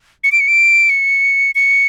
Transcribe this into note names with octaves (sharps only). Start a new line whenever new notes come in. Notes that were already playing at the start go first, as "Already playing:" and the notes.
C#7
D7
C#7
D7
C#7
C#7